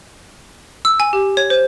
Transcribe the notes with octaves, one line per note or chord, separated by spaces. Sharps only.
E6
G#5
G4
C#5
C5